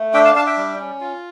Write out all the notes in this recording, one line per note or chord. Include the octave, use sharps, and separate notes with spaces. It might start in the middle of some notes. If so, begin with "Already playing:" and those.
Already playing: A3
D4 E5 G5
F5 A5
D4 F5 A5
E5 G5
G3
C#4
F4